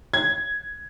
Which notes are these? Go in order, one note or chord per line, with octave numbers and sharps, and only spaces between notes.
G#6